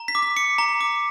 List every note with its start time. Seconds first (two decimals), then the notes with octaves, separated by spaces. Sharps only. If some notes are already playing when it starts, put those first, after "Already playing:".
Already playing: A#5
0.08 B6
0.15 D6
0.22 B6
0.36 D6 C#7
0.58 A#5
0.81 D6